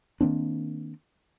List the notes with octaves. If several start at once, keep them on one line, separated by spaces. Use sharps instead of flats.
D#3 A#3 C4 D4